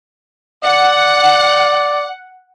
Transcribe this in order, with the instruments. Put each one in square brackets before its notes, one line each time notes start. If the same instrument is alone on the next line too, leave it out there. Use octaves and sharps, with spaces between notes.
[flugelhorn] D5 [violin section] F#5